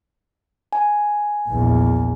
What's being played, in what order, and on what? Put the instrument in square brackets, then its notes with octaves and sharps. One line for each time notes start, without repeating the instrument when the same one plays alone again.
[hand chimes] G#5
[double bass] A#1 E2